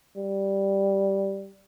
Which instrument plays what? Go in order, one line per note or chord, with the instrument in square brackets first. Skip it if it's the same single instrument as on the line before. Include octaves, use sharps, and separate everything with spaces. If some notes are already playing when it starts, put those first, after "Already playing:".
[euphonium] G3